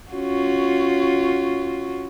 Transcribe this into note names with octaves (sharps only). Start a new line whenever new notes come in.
C#4 F4 F#4